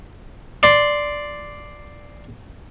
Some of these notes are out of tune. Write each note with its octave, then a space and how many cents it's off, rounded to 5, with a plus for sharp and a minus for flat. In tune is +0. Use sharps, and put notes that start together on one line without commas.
D5 +0 C6 +0